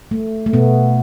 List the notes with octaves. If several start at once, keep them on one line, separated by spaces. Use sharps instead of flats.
A3
A3
B2 B3